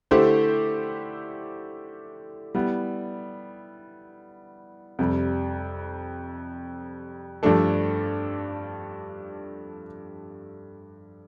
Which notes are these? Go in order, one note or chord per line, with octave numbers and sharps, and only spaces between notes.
D3 A3 E4 G4 C5
G3 B3 E4
F2 C3 G3
G2 F3 A3 D4 A4